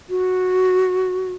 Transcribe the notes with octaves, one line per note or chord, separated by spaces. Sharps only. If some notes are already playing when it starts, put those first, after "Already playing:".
F#4